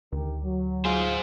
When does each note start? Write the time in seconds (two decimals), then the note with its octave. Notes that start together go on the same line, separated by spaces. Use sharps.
0.12 D2 D#3 G4 A#4
0.43 F#3
0.85 F4 G#4 C5